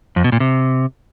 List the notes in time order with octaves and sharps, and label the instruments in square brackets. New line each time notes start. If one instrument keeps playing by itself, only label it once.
[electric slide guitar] F2
B2
A#2
C3